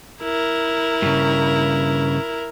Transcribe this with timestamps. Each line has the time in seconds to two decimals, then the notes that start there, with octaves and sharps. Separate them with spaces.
0.22 E4 A#4
1.02 G2 C#3